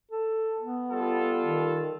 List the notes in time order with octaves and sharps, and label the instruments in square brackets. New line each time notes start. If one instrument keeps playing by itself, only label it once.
[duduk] A4
B3
[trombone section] G3 F4 A4
[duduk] D#3